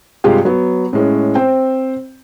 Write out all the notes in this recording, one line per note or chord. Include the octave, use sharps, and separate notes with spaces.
G2 C3 G#3 F4 G4
F#3 B3
A2 G#3 C#4
C4 C5 G5